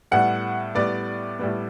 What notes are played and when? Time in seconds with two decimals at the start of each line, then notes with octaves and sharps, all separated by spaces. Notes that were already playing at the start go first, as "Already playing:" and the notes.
0.11 A2 G3 B3 F#5
0.75 A2 G3 B3 D5
1.39 A2 G3 B3